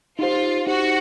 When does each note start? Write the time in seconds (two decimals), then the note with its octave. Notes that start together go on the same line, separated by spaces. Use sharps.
0.19 D#4 F4 G4 C5
0.67 D#4 F#4 G4 C5